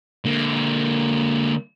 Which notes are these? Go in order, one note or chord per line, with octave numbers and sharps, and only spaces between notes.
D3 A#3